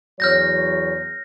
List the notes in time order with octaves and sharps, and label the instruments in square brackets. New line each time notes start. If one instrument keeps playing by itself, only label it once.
[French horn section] E2 F#3 C#5 [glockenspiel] F6 G6 A#6